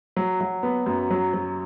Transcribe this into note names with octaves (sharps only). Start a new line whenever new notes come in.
F#3
F#3
B3
F#2
F#3
F#3